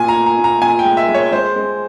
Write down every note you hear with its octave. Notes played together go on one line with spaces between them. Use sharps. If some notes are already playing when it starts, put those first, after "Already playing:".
Already playing: A#2 G#5
A#5
A#2
A#5
A#2
A#5
A#2 G#5
G5
G#3
E5
G#3
C#5
G#3 C5
G#3